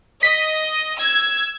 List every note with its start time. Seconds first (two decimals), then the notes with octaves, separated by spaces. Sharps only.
0.23 D#5 B6
1.00 E6 G#6